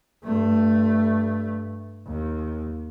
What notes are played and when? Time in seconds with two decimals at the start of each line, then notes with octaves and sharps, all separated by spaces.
0.24 G2 A3
2.06 D#2